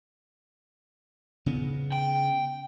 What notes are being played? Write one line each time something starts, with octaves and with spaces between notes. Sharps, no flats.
C#3 B3
G5